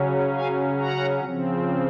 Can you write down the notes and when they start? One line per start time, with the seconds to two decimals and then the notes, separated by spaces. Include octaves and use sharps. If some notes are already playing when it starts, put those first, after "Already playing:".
Already playing: C#3 F#3 C#4
0.34 F5 G#5
0.79 F#5 A#5
1.24 C#3 F3 C4